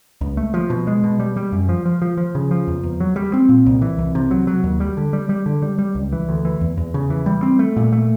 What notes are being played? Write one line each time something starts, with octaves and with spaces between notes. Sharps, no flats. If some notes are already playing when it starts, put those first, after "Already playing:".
C#2
A3
F3
B2
G#3
B2
G3
G3
F#2
F3
F3
F3
F3
C#3
F3
E2
E2
F#3
G3
C4
A#2
C2
E3
C2
C3
F#3
F#3
D#2
G3
D3
G3
G3
D3
G3
G3
C#2
E3
D2
E3
E2
E2
C#3
E3
G3
C4
A3
A#2
A3